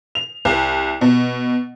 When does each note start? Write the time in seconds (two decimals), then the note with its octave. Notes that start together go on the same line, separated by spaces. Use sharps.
0.15 F7
0.45 C2
1.01 B2